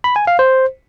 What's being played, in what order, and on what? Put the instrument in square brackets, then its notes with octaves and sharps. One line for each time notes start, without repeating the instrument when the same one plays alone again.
[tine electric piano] B5
G#5
F5
C5